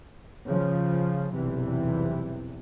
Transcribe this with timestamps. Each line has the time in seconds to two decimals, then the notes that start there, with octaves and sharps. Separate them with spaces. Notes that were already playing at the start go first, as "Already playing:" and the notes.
0.46 C#3 F3
1.31 B1 E2 G2 C3 E3